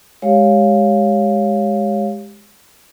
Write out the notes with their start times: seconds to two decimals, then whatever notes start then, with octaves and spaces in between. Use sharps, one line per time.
0.22 G#3 G4 C#5 F5